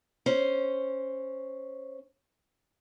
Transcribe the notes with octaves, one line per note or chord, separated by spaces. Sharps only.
C#4 C5